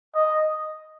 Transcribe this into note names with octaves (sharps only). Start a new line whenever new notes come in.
D#5